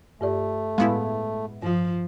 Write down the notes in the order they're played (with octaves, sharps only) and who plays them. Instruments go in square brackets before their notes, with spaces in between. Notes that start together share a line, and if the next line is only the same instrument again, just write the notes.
[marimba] G2 G4 D5 [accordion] A3
[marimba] A2 F5 [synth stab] G#3 B3 E4
[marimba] G2 F4 [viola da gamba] F3